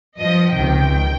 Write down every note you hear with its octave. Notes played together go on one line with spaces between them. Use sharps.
G2 F3 D#5
C#2 C3 D#3 G5